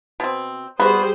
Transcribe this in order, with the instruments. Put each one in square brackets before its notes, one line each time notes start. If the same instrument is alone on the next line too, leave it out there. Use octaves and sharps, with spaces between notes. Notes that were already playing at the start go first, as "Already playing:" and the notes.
[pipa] B2 C4
[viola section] G3 G#4 C5 [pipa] B3 F#4